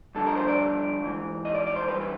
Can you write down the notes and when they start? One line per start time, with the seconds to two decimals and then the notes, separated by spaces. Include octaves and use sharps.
0.15 G2 D3 F3 A4
0.27 A#4
0.36 C5
0.48 D5
1.01 G#2 E3
1.45 D#5
1.55 D5
1.67 D5
1.76 C5
1.88 G2 E3 B4
2.01 B4